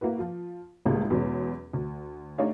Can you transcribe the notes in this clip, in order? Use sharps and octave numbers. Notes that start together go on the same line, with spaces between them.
A#3 E4 F#4 B4
F3 F4
G#1 C#2 A2 G3 G#3 A#3
E2 B2 F#3 G#3 C#4
D2
A3 D4 D#4 G4 C#5 F5